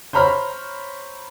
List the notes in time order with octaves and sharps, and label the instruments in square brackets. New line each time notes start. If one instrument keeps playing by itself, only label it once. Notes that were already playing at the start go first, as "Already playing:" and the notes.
[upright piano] C5 C#5 A#5 B5 F6